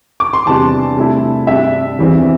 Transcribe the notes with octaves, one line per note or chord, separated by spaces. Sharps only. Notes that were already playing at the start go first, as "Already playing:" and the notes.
D6
C6
E2 C3 E3 G3 D4 A5
C3 A3 E4
G2 G3 D4 E5
E2 E3 G3 C4 E4